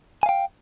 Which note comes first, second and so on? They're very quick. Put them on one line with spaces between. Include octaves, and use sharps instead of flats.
G#5 F5 G5